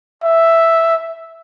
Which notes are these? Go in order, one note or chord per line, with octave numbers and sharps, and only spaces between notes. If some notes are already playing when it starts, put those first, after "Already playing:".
E5